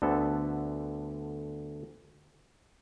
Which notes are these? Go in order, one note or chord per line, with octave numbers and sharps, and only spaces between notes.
D2 D3 B3 A4